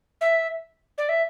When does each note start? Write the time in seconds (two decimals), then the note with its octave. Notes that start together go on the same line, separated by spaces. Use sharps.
0.21 E5
0.98 D5
1.09 E5